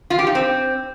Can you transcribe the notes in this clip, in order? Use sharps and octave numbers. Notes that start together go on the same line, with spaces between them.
F4
G4
D#4
C4